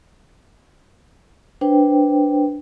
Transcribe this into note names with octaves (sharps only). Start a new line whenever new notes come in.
D4 B4 C5 G5